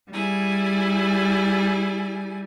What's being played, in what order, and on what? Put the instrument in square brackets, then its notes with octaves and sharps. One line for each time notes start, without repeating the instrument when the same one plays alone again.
[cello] G3 [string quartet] E4 G#4 G#5